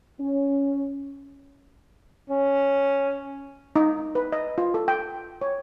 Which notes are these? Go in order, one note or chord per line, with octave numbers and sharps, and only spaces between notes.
C#4
C#4
D#4
B4
D#5
F4
A4
G5
C#5